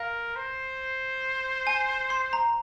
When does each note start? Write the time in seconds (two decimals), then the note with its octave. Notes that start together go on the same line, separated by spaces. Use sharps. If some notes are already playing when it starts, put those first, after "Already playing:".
Already playing: A#4 F5
0.36 C5
1.67 G#5
2.10 C6
2.33 A#5